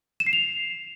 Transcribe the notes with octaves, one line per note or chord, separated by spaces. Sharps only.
E7
C7
F7